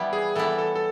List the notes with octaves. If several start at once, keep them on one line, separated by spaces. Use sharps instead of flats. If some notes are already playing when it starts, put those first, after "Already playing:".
Already playing: E3 G3 B3 E4
G#4
E3 G3 B3 E4 A4
A4
A4